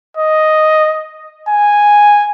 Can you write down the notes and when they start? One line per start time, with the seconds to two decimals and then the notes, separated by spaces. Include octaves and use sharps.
0.17 D#5
1.49 G#5